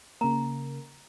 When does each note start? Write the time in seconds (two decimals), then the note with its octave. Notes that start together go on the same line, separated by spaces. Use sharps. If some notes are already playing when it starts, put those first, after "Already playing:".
0.21 C#3 A#3 A#5